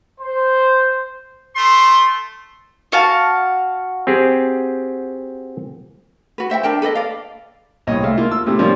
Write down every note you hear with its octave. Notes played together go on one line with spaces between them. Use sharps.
C5
A3 C6
F#4 F5 A5
C4 G4 G#4
F#4 B4
C5 E5 F#5 G5
D4 A#4 G5 A5
A4 B4 D5 D#5
D5 F5
C2 A#2 C#5 D#5
G#3 A3 E5 F5
A#3 F4
E6
A2 C3 A3
F3 G3 A#3 C#4 D4 F4